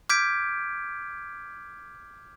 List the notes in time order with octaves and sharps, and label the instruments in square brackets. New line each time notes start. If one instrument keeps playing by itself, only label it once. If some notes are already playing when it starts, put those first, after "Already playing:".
[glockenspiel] D6 F6 G6 G#6 B6 D7